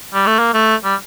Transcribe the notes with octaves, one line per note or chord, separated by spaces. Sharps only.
G3
A3
A#3
A3
G3